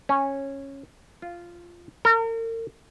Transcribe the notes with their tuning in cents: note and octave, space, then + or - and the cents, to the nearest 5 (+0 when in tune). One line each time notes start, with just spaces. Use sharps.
C#4 -10
F4 -10
A#4 -40